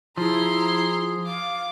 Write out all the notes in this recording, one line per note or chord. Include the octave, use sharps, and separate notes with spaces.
F3 E4 G#4 A#5 C6
F5 D6